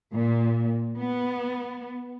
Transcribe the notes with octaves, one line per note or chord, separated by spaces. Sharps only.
A#2
B3